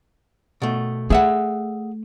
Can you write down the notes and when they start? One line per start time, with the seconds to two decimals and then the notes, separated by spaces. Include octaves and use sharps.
0.62 B2 A3
1.10 A3 G#4 E5 F#5